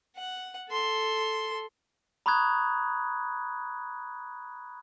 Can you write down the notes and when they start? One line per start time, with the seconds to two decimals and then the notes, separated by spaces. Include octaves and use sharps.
0.16 F#5
0.69 A4 C6
2.26 A#5 B5 C#6 D#6 F#6 G#6